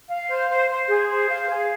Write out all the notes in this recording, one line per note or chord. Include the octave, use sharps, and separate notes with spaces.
F5
C5
C5
C5
G#4
C5
F5
G#4